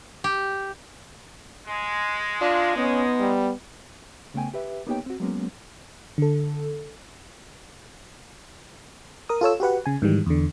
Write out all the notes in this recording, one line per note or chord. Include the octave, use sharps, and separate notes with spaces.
G4
G#3
D4 F4
B3 C#4 D#4
G3
C#3 A3 B3 G5 G#5
G4 B4 E5
A#3 B3 D#4 G4 C#5 G5
C4 F#4
F#3 G#3 A#3 B3 C#4
D3 A4
A#4 D#6
F4 A4 C#5 E6
F#4 G4 B4 F#5
C#3 G#5
G#2 D#3 E3 G3
E2 D3